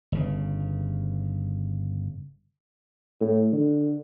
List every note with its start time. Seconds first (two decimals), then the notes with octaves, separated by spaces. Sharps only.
0.12 G1 C#3
3.20 A2
3.53 D3